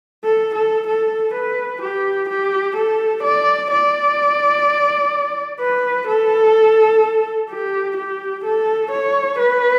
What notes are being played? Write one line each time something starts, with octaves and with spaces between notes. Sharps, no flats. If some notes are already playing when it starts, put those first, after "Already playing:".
A4
A4
A4
B4
G4
G4
A4
D5
D5
B4
A4
G4
G4
A4
C#5
B4